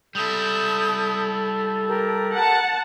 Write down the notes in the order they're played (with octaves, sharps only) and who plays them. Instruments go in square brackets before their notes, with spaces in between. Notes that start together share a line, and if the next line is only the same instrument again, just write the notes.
[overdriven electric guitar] G3 E4 [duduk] A4 [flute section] D#6 G6
[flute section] G4 A#4
[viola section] F#5 A5